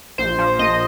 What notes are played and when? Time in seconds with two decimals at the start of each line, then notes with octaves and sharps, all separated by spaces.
0.18 A#1 C5
0.38 F3
0.59 A#1 D#5